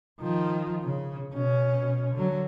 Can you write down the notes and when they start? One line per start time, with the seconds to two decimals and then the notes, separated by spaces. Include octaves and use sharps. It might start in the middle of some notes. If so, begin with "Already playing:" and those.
0.20 D#3 F3
0.83 C#3
1.33 B2 C#4
2.14 D3 F#3